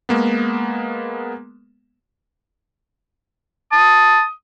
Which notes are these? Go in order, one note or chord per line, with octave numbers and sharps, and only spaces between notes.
G#3 A#3 B3
A5 D#6